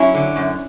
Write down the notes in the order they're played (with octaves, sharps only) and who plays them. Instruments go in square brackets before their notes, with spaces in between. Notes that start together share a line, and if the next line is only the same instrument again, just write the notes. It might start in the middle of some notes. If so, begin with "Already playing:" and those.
Already playing: [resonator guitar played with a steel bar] F#3 C#4 E4
D3
F#2